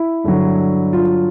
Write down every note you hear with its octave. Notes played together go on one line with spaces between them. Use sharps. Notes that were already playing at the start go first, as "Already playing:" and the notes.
Already playing: E4
G2 D3 F#3
F4